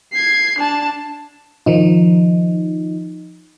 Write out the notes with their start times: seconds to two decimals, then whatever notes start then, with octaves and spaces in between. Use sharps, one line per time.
0.13 G#6 C7
0.59 D4 A5
1.66 D#3 F3 D#4